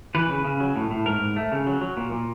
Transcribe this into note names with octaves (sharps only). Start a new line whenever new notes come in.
E3 B4
C#3
C#3
F#3
A2
A2
G#2 A#4
G#2
A3
C#3
F#3
F#3
A#2
A#2